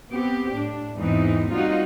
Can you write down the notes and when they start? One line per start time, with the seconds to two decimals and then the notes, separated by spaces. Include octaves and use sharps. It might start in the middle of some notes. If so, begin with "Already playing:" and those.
0.10 B3 C4 G4
0.53 A2 D4
0.97 E2 G#2 E3 G#3 C4 D#4
1.52 G3 A#3 C4 D#4 F4 F#4